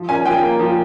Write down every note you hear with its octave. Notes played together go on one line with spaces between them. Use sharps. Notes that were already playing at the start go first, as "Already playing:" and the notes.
Already playing: F3
C#4 G#5
F3 G5
A#3
F3